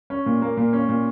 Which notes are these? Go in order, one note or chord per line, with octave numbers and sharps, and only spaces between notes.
C#4
A#2
A#3
A#2
C#4
A#2